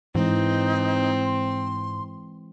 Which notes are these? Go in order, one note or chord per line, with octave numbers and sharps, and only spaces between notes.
G#2 E3 G#3 C4 D#4
C6